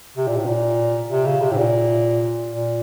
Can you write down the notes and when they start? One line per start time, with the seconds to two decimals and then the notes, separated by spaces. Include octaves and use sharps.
0.17 C3
0.27 A#2
0.36 A2
0.46 A#2
1.10 C3
1.25 C#3
1.41 C3
1.51 A2
1.57 A#2
2.50 A#2